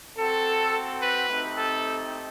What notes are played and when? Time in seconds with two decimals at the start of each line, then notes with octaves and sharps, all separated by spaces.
0.17 C4 F#4 A4
1.02 B4
1.29 A3 C4 D#4 G4
1.58 A4